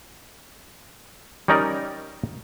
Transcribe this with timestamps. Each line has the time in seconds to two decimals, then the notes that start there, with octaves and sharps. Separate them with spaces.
1.48 G3 C#4 D#4 A#4 D5